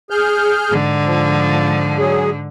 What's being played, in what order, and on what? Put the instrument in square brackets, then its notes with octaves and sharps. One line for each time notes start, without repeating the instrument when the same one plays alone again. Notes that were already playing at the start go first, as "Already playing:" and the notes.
[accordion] G#4 F6 G6
[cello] G#2 D3
[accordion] F3
F#3 G#4